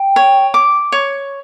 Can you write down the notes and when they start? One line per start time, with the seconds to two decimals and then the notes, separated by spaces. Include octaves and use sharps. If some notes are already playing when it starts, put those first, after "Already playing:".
Already playing: G5
0.16 C#5
0.54 D6
0.92 C#5